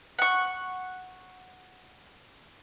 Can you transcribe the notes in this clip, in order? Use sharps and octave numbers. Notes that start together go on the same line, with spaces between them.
F#5 C#6